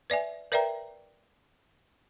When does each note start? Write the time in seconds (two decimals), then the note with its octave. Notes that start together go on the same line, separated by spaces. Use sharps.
0.10 B4 D5 E5 G#5
0.52 A#4 B4 D5 E5 G5 A#5